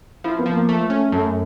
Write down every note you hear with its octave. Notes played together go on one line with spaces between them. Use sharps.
F3 E4
B3
F3
A#3
A3
C#4
F#2 A3